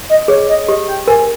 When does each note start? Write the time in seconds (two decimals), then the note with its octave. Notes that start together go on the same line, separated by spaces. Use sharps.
0.09 D#5
0.28 G#4 C#5
0.48 D#5
0.68 G4 D#5
0.88 G5
1.08 A#4 G#5